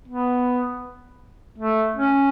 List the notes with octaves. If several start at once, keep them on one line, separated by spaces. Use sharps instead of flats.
B3
A3
C#4